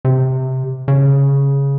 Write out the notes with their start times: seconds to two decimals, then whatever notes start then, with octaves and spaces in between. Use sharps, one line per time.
0.05 C3
0.88 C#3